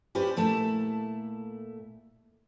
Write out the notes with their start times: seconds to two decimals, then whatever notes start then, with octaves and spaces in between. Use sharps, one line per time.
0.15 C#4 G4 B4 C5 D5
0.36 A#2 A3 E4 A5